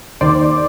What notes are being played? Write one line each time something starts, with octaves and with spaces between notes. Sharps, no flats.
D#2 D#3 C5 D5